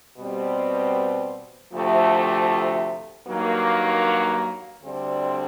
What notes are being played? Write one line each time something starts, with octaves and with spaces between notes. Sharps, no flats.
B2 G3 C4
D2 C3 F3 A3
G2 D#3 F#3 A#3
D2 D3 G3 C4